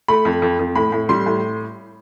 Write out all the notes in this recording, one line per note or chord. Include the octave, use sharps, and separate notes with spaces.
A3 B5
F2
F2
F2
A2 B5
A2
G3 C6
A2